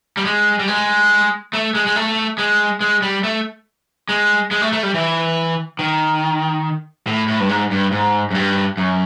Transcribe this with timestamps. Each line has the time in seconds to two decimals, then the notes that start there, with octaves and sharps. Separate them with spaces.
0.17 G3
0.25 G#3
0.59 G3
0.68 G#3
1.53 A3
1.75 G#3
1.86 G#3
1.96 A3
2.38 G#3
2.81 G#3
3.02 G3
3.23 A3
4.09 G#3
4.51 G#3
4.62 A3
4.73 A3
4.83 G3
4.94 E3
5.79 D#3
7.07 A2
7.28 A2
7.40 G2
7.49 G#2
7.71 G2
7.92 G#2
8.31 F#2
8.35 G2
8.77 F#2